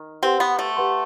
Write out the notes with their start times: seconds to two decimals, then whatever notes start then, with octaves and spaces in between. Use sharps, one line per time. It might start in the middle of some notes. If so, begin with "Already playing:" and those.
Already playing: D#3
0.23 C4 G4 B4 F#5 C6
0.40 B3
0.59 A3
0.76 G4 B4 F#5 C6